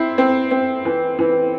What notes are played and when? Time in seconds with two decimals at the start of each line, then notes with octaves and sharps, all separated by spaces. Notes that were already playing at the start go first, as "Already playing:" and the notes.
Already playing: C4 E4
0.18 C4
0.51 C4
0.85 E3
1.19 E3